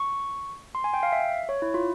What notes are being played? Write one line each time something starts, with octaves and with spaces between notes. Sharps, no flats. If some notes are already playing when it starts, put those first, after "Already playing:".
Already playing: C#6
C6
G#5
G5
F5
E5
C#5
E4
F4